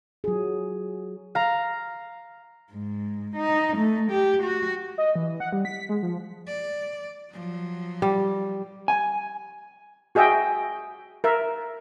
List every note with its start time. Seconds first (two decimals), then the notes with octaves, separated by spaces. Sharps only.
0.24 F#3 F4 G#4
1.35 F5 A#5
2.72 G#2
3.36 D#4
3.77 A3
4.11 G4
4.43 F#4
4.98 D#5
5.16 E3
5.40 F#5
5.53 G3
5.65 B6
5.89 G#3
6.03 F3
6.47 D5
7.32 F3 F#3
8.02 G3
8.88 G#5
10.15 F#4 G#4 D#5 E5 G5
11.24 A#4 E5